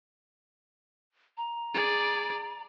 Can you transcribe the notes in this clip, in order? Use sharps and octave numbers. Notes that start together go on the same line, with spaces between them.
A#5
G#4 D5